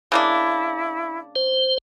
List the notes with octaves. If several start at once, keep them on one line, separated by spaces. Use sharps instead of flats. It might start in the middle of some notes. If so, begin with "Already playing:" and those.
C#3 A#3 D4 E4
C5